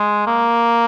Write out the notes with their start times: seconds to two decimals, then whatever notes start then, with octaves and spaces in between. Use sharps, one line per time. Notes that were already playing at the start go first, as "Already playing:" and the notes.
Already playing: G#3
0.27 A#3